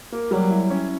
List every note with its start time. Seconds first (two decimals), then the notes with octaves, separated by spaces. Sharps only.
0.12 A#3
0.31 F#3 G3
0.51 E4
0.70 C#4